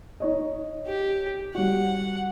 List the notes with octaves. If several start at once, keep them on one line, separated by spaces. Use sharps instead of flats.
D#4 C#5 D#5
G4
G3 F#4 F#5